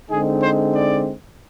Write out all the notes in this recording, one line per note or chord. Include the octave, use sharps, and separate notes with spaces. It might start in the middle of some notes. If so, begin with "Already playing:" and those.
D3 G#3 C4 D#4 G#4
C5
D5